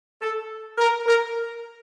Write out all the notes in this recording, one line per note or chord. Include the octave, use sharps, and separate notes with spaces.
A4
A#4
A#4